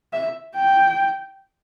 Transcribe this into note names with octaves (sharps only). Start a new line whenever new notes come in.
E5
G5